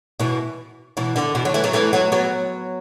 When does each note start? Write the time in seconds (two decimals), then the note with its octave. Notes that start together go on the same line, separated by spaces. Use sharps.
0.20 B2 E3
0.97 B2 E3
1.16 D3
1.35 B2 E3
1.45 D3 F#3
1.54 E3 A3
1.64 F#3 B3
1.73 E3 A3
1.93 F#3 B3
2.12 F#3 B3